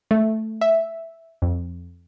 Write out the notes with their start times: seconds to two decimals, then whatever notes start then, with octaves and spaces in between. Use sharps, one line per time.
0.11 A3
0.61 E5
1.42 F2